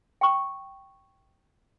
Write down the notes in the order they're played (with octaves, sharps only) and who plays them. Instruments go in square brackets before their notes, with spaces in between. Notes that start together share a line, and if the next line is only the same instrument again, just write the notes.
[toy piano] G5 C#6